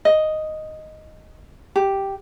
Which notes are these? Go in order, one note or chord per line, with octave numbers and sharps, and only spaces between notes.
D#5
G4